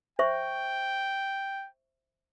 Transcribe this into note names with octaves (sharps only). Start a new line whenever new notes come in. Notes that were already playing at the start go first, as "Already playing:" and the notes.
C5 E5 G5 C#6